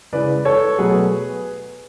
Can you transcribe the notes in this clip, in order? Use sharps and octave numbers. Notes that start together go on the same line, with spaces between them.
C#3 E3 G#3 B4 D5
A4 C#5
B2 F#3 A3 G#4 B4